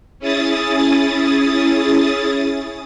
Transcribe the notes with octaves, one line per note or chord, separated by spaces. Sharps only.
C#4 E4 G#4 D#6 A6